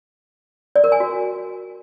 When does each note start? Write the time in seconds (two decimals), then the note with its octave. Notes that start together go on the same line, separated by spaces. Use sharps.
0.76 D5
0.84 A#4
0.92 G#5
1.00 F#4